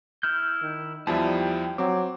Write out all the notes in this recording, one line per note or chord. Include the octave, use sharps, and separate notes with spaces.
E4 F6 G6
D#3
E2 F3 G3 D#4 E4 A5
G5
F#3 C4 D6